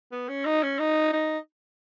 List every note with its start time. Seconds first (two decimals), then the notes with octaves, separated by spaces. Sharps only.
0.12 B3
0.29 C#4
0.45 D#4
0.63 C#4
0.79 D#4
1.13 D#4